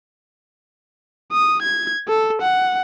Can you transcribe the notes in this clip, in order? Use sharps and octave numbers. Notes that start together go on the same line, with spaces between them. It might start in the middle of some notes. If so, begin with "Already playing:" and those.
D#6
G#6
A4
F#5